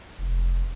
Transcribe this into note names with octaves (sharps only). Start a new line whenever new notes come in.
F1